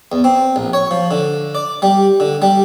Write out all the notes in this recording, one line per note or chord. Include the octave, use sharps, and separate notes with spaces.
E2
C4
A#1
C#5
F3
D3
D5
G3
D3
G3